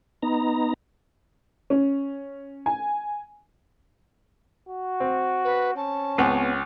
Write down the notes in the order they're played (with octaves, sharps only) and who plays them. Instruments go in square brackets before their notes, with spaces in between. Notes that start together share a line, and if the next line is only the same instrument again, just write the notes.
[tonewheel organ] B3 D#4 A#5
[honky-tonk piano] C#4
G#5
[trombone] F#4
[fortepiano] C4
[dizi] B4
[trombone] C#4 [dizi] A5
[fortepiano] C#2 [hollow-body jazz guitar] B3 C4